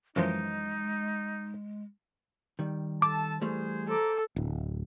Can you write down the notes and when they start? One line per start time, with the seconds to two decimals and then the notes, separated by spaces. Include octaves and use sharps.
0.16 F#2 E3 F3 G#3 D#4
2.59 D#3 G3
3.02 A4 A5 D6
3.41 E3 G3 A3 G#4 C5
3.88 A4 C5 A#5 D6
4.36 D1